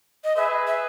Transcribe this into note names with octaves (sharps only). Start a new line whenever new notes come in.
D#5
G#4 B4 E5
E5